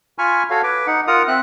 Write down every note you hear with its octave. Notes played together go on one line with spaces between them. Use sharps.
F4 G#5 B5 C#6 F6
F#4 A4 C#5 F5
B4 D6
D#4 F#5
F4 A#4 F#5 A#5 D#6
C4 E5 F#6